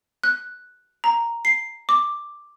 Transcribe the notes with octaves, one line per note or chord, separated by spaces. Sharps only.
F#6
A#5
C7
D6